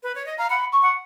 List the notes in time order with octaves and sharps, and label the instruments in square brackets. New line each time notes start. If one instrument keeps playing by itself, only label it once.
[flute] B4
C#5
D#5
[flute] F5 [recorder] A#5
[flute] F#5 [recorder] B5
[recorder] C#6
[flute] F#5